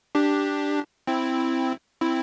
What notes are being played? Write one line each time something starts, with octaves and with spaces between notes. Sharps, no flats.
D4 G4
C4 E4
C4 E4